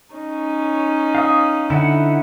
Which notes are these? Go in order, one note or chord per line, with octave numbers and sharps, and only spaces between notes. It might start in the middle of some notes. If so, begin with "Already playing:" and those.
C#4 D#4
F5 D#6
D3 E4 F#5